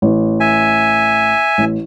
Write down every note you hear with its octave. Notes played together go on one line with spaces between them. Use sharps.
A1
E5 G#5
A1